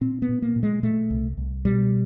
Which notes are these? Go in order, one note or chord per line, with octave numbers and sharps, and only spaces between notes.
A#2 C4
B3
A#2
A#3
A#2
G#3
A#2 A3
C2
C2
B2 G3